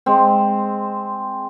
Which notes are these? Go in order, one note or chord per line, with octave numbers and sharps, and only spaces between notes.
G#3 C4